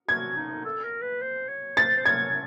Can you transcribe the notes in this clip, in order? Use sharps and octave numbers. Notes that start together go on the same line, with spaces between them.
F#4 G#6
D#4
A4
A#4
B4
C5
C#5
C5 A6
C5
C#5 G#6